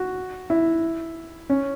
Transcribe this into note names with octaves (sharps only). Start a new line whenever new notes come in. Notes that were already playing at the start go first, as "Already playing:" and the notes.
Already playing: F#4
E4
C#4